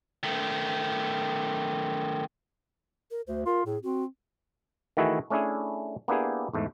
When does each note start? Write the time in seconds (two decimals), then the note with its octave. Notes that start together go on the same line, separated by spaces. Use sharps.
0.23 D#3 A3
3.11 A#4
3.27 D2 C5
3.46 F4 A#4
3.66 A2 G#4
3.83 C4 F#4
4.97 D#3 E3 A3 E4 F#4 G#4
5.30 A3 C#4 D4 E4 G#4
6.08 A#3 B3 D4 E4 G4 G#4
6.53 E2 G#2 A3